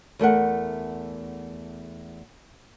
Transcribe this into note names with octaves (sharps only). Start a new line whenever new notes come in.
E2 A3 A#4 F#5